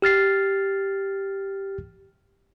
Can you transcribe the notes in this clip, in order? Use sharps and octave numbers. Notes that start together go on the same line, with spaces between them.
G4 F6 A6 C7